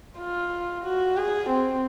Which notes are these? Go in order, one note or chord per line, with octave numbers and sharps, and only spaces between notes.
F4
F#4
G#4
C4